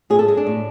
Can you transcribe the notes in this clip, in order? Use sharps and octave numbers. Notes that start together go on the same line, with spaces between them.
A2 G#4
A4
G#3 G#4
D4
A2